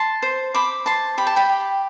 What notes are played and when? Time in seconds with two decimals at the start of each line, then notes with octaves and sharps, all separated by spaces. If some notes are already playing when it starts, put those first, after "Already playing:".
Already playing: A5 C6
0.23 C5
0.54 C5 B5 D6
0.86 C5 A5 C6
1.18 G4 B5
1.27 A5
1.36 G5 B5
1.50 G4